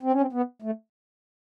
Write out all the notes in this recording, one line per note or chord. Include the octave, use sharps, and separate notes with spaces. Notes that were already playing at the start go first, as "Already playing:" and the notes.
C4
C#4
C4
B3
A3